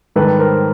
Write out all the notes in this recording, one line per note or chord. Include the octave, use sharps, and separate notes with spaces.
G#2 D#3 G3 A4 B4
A#4 C5